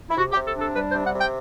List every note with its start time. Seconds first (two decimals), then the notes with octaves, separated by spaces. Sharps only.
0.09 E4
0.16 C3 F#4
0.31 G4
0.36 C3
0.46 A4
0.55 D4
0.60 A4
0.75 G3 B4
0.90 C5
0.94 C3
1.04 F#5
1.14 C3 G5